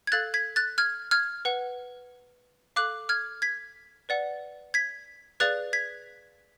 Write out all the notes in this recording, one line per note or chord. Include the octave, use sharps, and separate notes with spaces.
G#6
A4 F5 F#6 A6
G#6 B6
F#6 A6
F6 G#6
F6 G#6
B4 F#5
A4 F5 D6 F#6
F6 G#6
G#6 B6
B4 D5 F#5
G#6 B6
G#4 B4 D5 F5 F#6 A6
G#6 B6